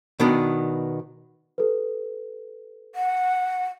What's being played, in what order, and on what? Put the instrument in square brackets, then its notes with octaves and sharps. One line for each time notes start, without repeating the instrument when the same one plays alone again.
[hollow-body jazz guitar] B2 D#3 B3 D4
[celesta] G4 A4 B4
[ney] F#5